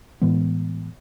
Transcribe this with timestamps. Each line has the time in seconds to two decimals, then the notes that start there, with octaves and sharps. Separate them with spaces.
0.22 A2 E3 G#3 B3